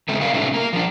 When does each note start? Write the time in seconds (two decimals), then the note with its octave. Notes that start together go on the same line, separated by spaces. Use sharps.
0.08 C#3 G#3 A3 C4
0.21 F#4 A#4 B4 D5 F5
0.33 A2 C3 G#3 A3 C#4 D#4
0.54 A#3 A#4
0.73 F3 D4